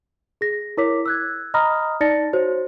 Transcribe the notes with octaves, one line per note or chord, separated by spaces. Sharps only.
G#4 A#6
E4 A#4 C#5 D6 B6
E6 F#6 G#6
D#5 A#5 B5 D#6 F6 A#6
D#4 D5 A5 A6 A#6 C#7
F#4 C5 C#5